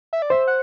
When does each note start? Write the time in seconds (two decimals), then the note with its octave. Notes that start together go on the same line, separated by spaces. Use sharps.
0.13 E5
0.22 D5
0.30 C5 E5
0.48 F#5